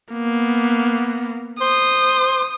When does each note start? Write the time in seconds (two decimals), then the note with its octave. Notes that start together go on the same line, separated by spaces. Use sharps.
0.13 A#3 B3
1.61 C5 D#6